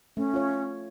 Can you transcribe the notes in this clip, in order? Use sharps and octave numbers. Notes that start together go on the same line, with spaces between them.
A3 C#4
F4 C#5